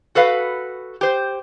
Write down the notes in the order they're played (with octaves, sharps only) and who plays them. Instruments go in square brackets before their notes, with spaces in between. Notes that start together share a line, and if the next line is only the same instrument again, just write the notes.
[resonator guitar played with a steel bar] F#4 A4 B4 F5
G4 C5